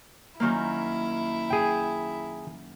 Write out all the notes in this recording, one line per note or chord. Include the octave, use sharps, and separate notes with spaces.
F#2 D#3 A#3 E4
G#4 G5